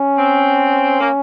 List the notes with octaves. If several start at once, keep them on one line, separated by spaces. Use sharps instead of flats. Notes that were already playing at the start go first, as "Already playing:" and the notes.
Already playing: C#4
C4
A#3